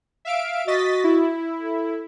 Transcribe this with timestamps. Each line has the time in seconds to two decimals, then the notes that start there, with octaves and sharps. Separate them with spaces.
0.25 E5 F5 D7
0.67 F#4 D#5 A6 B6
1.04 E4
1.59 A4